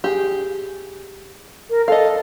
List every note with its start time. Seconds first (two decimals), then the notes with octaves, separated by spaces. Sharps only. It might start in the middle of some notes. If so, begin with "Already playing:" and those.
0.04 G4 G#4
1.70 A#4
1.88 A4 D#5 F5